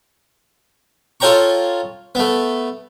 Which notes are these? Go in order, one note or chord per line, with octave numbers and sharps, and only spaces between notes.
F4 A4 C#5 G5 A#5 C#6
A3 B3